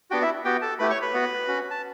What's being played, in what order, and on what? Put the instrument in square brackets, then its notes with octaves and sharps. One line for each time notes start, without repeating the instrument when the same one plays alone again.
[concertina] B3 D4 F#4 G4 G5
E4 E5
B3 F#4 G4 G5
A4 A5
A3 E4 G4 B4 B5
C#5 C#6
B4 B5
B3 F#4
C#4 F#4
A5